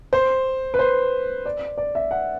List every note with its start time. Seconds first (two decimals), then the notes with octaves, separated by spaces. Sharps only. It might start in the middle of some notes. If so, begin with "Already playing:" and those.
0.13 C5
0.74 B4
0.79 C5
1.46 D5
1.78 D5
1.95 E5
2.11 F#5